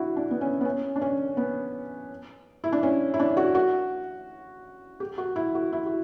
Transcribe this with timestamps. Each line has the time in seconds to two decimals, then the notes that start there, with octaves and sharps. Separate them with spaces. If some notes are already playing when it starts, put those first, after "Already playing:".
Already playing: D4 E4 F#4
0.16 D4
0.31 B3
0.41 C#4
0.61 B3
0.65 C#4
0.96 D4
1.01 C#4
1.37 B3
2.64 E4
2.72 D4
2.83 C#4
3.14 E4
3.19 D4
3.37 F#4
3.55 F#4
5.00 G4
5.18 F#4
5.36 E4
5.55 F#4
5.72 E4
5.86 F#4